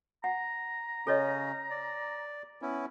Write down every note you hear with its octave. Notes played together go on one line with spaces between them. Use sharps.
F#5 A#5
C#3 C#4 A4 C#5 D#5
D5
B3 C#4 E4